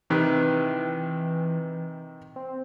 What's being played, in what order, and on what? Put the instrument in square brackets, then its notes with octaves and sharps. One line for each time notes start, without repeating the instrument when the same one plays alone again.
[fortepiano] C3 D#3 B4 [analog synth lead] E3
[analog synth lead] C4